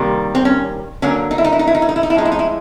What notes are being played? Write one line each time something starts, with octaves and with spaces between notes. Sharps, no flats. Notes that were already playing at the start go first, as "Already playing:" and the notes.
Already playing: C3 D#3 G3 A#3
C4
C#4
D3 F#3 A#3 C#4
D#4
E4
D#4
E4
D#4
E4
D#4
E4
D#4
E4
D#4
E4
A2 F3 G#3 D#4
E4
D#4
E4